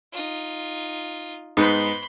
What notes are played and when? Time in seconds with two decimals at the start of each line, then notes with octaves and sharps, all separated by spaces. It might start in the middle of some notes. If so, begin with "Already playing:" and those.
0.12 D#4 F4
1.57 G#2 B3 D#4 B5 C6